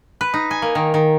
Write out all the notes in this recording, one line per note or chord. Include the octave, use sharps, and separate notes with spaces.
B4
D#4
G#5
A#3
D#3
D#3